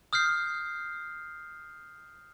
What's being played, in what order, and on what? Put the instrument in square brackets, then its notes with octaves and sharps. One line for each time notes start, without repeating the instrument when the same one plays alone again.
[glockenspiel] D#6 F6 G6 C7